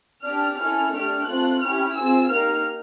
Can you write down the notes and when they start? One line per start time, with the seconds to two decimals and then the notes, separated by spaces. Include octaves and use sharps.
0.24 D4 G4 F6
0.59 C#4 E4 A4 F6
0.93 A3 D4 G4 F6
1.27 A3 C4 F4 A4 F#6
1.62 C#4 E4 G4 F6
1.96 C4 F4 G#4 E6
2.30 A#3 D#4 G4 F6